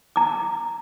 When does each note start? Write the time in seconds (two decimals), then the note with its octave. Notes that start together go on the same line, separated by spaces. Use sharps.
0.16 A#5 D6